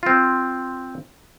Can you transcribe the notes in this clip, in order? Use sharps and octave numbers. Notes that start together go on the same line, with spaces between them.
C4 F4